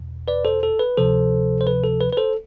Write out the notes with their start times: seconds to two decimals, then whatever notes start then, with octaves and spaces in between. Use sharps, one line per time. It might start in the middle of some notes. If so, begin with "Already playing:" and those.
Already playing: E2 B2
0.28 B4 D5
0.45 A4 C5
0.63 A4
0.79 B4
0.97 D2 C3 F3 A4 C5
1.61 C5
1.67 B4
1.84 A4
2.01 B4
2.12 B4
2.17 A4 C5